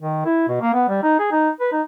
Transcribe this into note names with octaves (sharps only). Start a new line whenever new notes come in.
D#3
E4
B2
A#3
B3
G3
D#4
G#4
D#4
B4
D#4